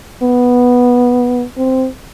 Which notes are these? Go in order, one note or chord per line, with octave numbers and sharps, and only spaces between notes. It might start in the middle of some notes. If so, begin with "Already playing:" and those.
B3
C4